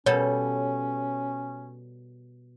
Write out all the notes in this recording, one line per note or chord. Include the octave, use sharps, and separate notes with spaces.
B2 G3 C#4 A4 C#5